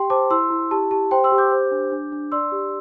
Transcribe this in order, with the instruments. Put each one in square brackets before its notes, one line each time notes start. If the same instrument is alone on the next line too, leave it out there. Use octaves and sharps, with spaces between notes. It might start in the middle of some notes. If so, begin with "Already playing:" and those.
Already playing: [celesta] G4 G5 C6
C5 A5 D6
E4 C6 E6
E4
G4 A5
G4 A5
C5 G5 C6
C6 E6
G4
D6 G6
C5
D4
D4
D4
D5 C6 E6
G4